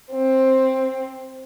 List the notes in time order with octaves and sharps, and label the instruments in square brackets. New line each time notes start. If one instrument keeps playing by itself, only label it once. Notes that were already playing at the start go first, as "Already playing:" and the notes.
[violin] C4